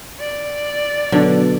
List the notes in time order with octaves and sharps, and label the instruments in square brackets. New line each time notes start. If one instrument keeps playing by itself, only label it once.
[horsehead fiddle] D5
[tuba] B2 [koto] D3 [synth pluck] F#3 D4